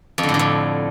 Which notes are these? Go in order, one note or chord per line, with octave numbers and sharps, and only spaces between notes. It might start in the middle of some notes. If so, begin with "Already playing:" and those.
F2
D3
A2
D3
F2